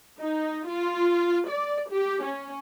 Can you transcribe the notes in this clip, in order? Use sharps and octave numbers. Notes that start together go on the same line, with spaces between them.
D#4
F4
D5
G4
C#4